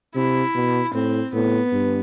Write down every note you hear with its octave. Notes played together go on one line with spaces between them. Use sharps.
C3 E4
B2
A2 C4
A2 B3
G2